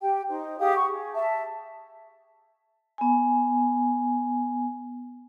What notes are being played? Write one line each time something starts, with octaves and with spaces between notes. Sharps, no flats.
G4 G5
D#4 C5
G4 G#4 F5 D#6
F#5 C#6 D#6
G#4
E5 A5
B3 G#5